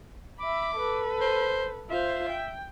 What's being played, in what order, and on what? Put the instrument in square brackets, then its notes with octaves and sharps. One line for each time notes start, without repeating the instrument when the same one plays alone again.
[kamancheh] E5 B5 [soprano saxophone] D6
[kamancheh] A4 B4
[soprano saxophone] C5
[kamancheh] F4 C5 [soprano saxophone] E5
[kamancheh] G5